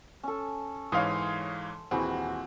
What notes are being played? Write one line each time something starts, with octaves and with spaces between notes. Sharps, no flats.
C#4 A4
G#2 E3 C#5 F5 C6 D#6
D#1 E3 C4 F#4 G#4 B5